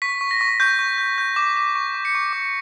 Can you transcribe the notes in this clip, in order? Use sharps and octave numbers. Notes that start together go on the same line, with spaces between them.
C#6 B6
C#6
A#6
C#6
C#6 G6
C#6
G6
G6
D6
D6
C#6
C#6
C#7
C#6
D6